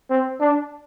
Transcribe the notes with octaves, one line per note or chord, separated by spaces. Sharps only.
C4
D4